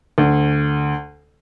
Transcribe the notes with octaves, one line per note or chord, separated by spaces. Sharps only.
D2